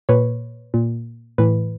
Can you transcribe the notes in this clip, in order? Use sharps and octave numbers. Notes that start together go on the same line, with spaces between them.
A#2 B4 C#5
A#2
A2 E3 B4